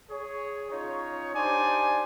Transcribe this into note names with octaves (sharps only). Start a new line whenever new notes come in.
G#4 C#5
C#4 D#4 F4 C#5
D4 D#4 G4 C5 D5 G#5